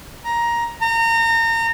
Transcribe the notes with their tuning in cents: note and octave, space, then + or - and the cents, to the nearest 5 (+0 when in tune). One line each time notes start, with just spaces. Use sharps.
A#5 +10
A#5 -30